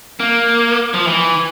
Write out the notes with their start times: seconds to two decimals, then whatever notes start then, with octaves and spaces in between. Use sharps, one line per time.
0.20 A#3
0.94 F3
1.07 E3